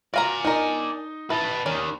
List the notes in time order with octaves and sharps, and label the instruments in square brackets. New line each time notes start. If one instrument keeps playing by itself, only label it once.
[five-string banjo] F#4 F5 A#5 [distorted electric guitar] D5 G#5
[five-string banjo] D4 A#4 [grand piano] D#4 D#5
[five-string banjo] E4 [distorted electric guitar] B4 A5
[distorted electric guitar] D#2 D#3 [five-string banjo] C#4 D5